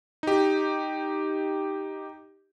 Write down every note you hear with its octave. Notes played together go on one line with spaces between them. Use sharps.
D#4 G4